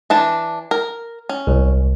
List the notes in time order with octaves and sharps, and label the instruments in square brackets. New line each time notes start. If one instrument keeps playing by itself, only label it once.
[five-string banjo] E3 D4 A5
A#4
C#4
[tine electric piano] C2